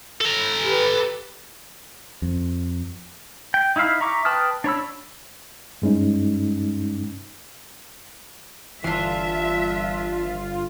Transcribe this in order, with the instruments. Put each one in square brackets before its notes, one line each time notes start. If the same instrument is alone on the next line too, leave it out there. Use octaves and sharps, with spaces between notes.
[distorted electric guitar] A4 A#5
[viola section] G4 B4
[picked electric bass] F2
[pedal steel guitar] G5
D#4 E4 E5 F5 B5
E5 A#5 C#6 D6
B4 G5 A5 D#6 F6
D4 C#5 B5 E6
[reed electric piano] G2 G#3 C#4 D#4
[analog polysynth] G1 F4 [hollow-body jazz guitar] E3 [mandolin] D4 C6 [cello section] E5